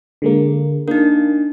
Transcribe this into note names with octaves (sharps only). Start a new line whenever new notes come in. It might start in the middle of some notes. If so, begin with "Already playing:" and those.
D3 G#3 A#3
A#3 D4 D#4